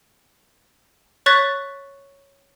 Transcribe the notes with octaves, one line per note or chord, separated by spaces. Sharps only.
C#5 C#6 F#6 A6 B6